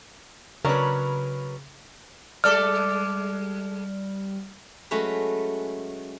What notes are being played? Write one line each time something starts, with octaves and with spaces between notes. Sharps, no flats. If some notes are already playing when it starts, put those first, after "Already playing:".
C#3 F#3 C#4 D4 A#4 B4
G3 G#3 A4 D5 F6
F#3 G#3 A3 C#4 B4